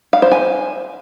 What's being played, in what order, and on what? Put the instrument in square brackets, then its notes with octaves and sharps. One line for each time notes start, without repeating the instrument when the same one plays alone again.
[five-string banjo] F5
C5
G#5